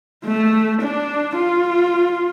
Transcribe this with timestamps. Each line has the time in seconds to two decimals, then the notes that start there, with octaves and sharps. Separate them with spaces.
0.25 A3
0.81 D4
1.36 F4